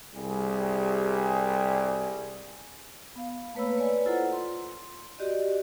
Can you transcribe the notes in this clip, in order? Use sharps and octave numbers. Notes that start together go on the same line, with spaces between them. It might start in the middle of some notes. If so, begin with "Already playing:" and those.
C2 G3 G#4
B3 F5
A3 A#3 B4 C#5 B5 E6
B4 C#5 D5 G#5
E4 F4 A4 C5 F#5 A#5
C6
F#4 G4 D5 D#5